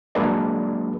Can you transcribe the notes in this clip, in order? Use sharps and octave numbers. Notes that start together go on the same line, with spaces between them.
F#3 G#3 A#3 D4 B4 D5